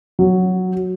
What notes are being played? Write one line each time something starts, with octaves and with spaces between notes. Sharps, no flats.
F#3